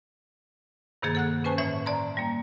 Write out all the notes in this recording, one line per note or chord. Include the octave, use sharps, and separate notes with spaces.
G2 C3 D#3 A#3 G#4 A6
A4 F#5 F#6
C#4 B4 C5 G#5 A5 C#6
A2 E3 C#5 E5
D5 A5 A#5 C6
G3 A#3